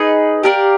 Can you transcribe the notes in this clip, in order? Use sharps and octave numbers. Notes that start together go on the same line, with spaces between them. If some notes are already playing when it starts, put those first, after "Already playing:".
Already playing: D#4 G#4 B4
G4 A#4 D5 F5